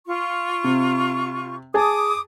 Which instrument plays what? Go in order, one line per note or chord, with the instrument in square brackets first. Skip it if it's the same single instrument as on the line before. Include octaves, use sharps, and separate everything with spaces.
[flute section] F4 C#6
[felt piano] C3
[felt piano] G#4 G#5 A5 [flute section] D6 D#6